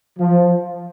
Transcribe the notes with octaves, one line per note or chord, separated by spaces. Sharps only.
F3